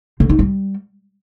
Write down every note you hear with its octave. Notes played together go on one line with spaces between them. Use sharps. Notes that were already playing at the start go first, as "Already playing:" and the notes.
D3
D#4
G3